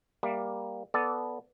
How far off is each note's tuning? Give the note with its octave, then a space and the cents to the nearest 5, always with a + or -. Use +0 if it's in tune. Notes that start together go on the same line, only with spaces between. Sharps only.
G3 +10 A#3 +10 E5 +35
B3 +0 A4 -15 D5 -10